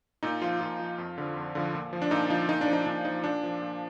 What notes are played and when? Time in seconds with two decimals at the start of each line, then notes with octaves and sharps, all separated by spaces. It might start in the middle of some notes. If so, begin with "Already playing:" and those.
0.23 A#2 D#4
0.42 F3 F4
0.61 A#2 F4
0.79 F3
0.98 F2
1.18 D3 F3
1.36 F2
1.55 D3 F3
1.74 A#2
1.93 F3
2.02 D4
2.11 A#2 D#4
2.30 F3 D#4
2.48 A#2 D#4
2.61 D4
2.68 F3
2.73 D#4
2.86 A#2 D4
3.05 F3 D#4
3.24 A#2 D4
3.43 F3
3.62 A#2